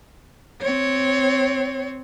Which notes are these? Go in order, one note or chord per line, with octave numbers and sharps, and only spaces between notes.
C4 C#5